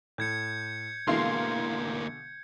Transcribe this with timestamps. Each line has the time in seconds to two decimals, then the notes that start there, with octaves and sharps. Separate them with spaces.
0.18 A2 G6 G#6 C#7
1.07 D2 B2 D3 E3 G#3 A#3 F5 C6